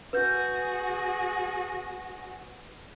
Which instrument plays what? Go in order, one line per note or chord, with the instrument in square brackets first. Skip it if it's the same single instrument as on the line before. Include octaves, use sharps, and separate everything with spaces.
[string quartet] F#4 G#4 [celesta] B4 G6